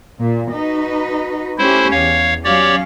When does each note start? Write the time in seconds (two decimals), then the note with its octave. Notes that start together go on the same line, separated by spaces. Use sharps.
0.20 A#2
0.51 D#4 F#4 B4
1.58 A3 C#4 E4 G4 C5
1.91 E2 C#5 F5
2.44 F#3 C#4 G4 C#5 D5 F5